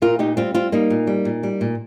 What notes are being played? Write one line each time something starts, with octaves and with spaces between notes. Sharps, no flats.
A#2 F4 A#4
A#2 D#4 G4
G3 C4 F4
G3 C4 F4
G3 A#3 D#4
A#2
G3
A#2
G3
A#2